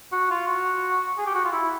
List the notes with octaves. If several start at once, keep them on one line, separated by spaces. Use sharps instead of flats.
F#4
F4
F#4
G#4
G4
F#4
F4
E4